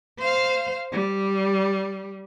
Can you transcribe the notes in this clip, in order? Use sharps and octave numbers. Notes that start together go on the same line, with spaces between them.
C5 F5
G3